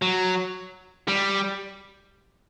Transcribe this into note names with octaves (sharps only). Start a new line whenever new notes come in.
F#3
G3